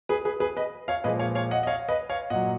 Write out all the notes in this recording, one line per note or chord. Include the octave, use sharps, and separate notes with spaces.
G#4 B4
G#4 B4
G#4 B4
B4 D#5
C#5 F5
A#2 F3 G#3 B4 D#5
C#5 F5
C#5 F5
D#5 F#5
D#5
C#5 F5
B4 D#5
C#5 F5
A#2 F#3 D#5 F#5